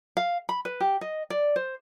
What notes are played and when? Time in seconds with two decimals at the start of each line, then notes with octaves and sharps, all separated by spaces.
0.17 F5
0.49 B5
0.65 B4
0.81 G4
1.01 D#5
1.30 D5
1.56 C5